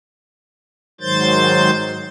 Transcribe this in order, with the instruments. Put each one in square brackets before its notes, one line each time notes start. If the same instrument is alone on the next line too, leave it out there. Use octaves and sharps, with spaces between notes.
[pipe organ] G#2 D#3 F#3 C5 G6 A6